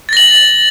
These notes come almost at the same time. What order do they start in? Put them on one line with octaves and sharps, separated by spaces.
A6 A#6 F#7